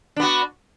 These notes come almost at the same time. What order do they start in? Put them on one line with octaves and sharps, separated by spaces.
D4 B3 F#4